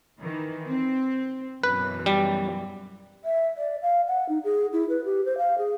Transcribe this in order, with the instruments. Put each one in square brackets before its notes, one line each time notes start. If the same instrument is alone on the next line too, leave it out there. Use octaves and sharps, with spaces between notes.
[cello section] D#3 E3
C4
[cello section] F#2 B2 E3 [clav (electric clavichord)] B4
[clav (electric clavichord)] G3
[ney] E5
D5
F5
F#5
D#4
G#4
E4
B4
G4
C5
F5
G#4